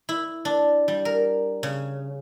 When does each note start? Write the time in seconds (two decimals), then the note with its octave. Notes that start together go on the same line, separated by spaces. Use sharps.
0.09 E4
0.45 D4
0.88 G3
1.05 A#4
1.63 C#3